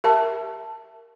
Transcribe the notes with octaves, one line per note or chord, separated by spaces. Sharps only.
G4 A#4 E5 A5